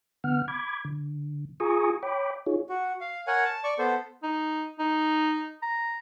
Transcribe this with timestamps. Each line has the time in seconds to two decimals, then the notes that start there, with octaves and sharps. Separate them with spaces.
0.24 D3 B3 F#5 F6
0.48 B5 D6 G#6
0.85 D3
1.60 F4 G#4 G#5 A#5 C#6 D#6
2.03 C#5 G5 B5 D6
2.46 D#4 F4 G#4 C#5
2.69 F#4
3.01 F5
3.27 A#4 C#5 F#5 G#5
3.45 A5
3.64 D5 C#6
3.79 B3 A4 C5
4.23 D#4
4.79 D#4
5.63 A#5